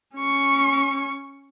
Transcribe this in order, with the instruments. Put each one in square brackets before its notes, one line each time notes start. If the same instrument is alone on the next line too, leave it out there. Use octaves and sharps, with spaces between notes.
[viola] C#4 C#6